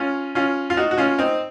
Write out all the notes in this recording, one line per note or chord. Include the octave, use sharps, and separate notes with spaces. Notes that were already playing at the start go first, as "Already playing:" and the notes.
Already playing: C#4 F4
C#4 F4
F4
D#4 F#4
F#4
C#4 F4
C4 D#4